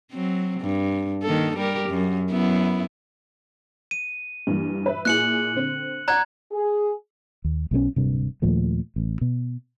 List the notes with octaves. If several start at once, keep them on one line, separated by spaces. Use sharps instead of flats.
F#3 C4
G2
D#3 A#3 A4
G3 G4 A#4
F#2
F#2 B3 E4
D#7
G2 E3 A#3
B4 E5
A#2 E4 G#4 F#6 C#7 F#7
D3 C4
D5 F#5 A#5 F#6 G#6
G#4
D#2
B1 B2 A3 C#4
D1 G2 C3
D#2 A#2 F3 A3
A1
B2